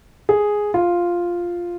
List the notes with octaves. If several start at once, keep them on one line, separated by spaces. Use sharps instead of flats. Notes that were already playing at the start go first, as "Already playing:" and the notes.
G#4
F4